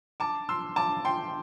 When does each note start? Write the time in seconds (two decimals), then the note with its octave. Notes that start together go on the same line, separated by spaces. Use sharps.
0.20 A5 D6
0.49 C6 E6
0.76 A5 D6
1.05 G5 C6